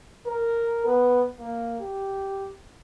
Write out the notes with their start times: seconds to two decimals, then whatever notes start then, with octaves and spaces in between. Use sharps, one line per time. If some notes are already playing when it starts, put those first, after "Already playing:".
0.26 A#4
0.86 B3
1.39 A#3
1.80 G4